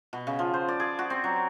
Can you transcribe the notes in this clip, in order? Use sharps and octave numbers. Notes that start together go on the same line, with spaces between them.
B2
C#3
F3
C5
D5
G#4
F#4
C4
F#3